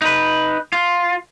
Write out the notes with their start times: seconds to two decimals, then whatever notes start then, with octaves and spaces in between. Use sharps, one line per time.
0.02 D#4 B4
0.73 F4